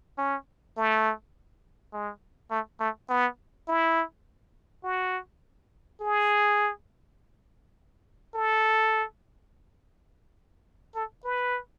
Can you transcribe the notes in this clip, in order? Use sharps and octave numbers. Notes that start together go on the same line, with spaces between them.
C#4
A3
G#3
A3
A3
B3
E4
F#4
G#4
A4
A4
B4